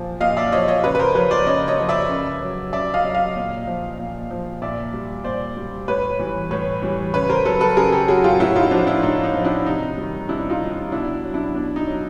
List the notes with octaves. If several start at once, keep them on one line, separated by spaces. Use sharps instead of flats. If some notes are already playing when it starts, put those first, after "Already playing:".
Already playing: A#2 F3
A#2 D#5 F5
D5 E5
F3 C#5 D#5
C#5 D#5
C#3 B4 C#5
B4
A#4 C5
F3 B4 C#5
C5 D5
C#3 C#5 D#5
C#5 D#5
F3
D5 E5
C#3
F#3
C#3 D5 E5
D#5 F5
F#3
D#5 F5
A#2
F3
A#2
F3
A#2 D5 E5
G3
A#2 C5 D5
G3
A2 B4 C#5
E3 G3
A2 B4 C#5
E3 G3
C#3 B4 C#5
A#4 C5
F#3 A4 B4
A4 B4
C#3 G#4 A#4
G4 A4
F#3 F#4 G#4
F4 G4
A2 E4 F#4
D#4 F4
F3 D4
D4 E4
A2 D#4
D#4
F3
D4 E4
C3 D#4
D#3 G3
C3 D4 E4
D#4 F4
D#3 G3
D#4
B2 D4 E4
F#3
D4 E4
B2 D4
D#4
F#3